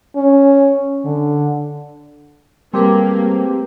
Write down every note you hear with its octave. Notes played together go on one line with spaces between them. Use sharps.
C#4
D3
G3 A3 A#3 C4 G4 G#4 B4